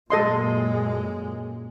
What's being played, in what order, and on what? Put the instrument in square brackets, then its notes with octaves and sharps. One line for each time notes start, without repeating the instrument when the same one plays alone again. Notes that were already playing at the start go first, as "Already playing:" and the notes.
[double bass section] F#2 A#2 [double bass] G#3 [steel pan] A4 D#5 C6